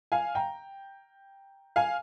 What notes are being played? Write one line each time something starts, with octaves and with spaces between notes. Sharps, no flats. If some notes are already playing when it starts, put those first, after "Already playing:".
F5 G#5
G5 A#5
F5 G#5